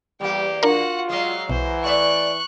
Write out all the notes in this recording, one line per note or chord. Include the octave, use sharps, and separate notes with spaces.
E2 G3 A#3 G4
D4 F4 F#4 A#4 F#5
F#3 G#3 D#5 F5
B1 E3 C5
A3 D5 E5 C#6 F#6